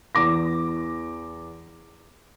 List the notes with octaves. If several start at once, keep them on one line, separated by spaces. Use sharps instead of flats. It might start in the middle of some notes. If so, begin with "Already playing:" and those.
E2 D6 A#6